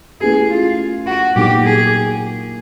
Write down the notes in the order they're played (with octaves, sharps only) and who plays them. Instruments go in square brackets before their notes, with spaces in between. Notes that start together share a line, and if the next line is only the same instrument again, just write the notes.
[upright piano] A3 C#4 E4 G4 B4 [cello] G#4
[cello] F4
F#4
[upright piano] A#2 F#3 B3 D#4 [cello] G4
[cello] G#4